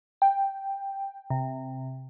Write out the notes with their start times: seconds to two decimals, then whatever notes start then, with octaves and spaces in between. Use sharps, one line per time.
0.22 G5
1.30 C3